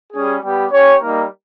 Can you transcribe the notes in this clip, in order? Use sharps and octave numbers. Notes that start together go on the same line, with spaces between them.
G3 C#4 G#4
G3 B3 G4
C#4 G4 C#5
G3 A#3 D#4 A#4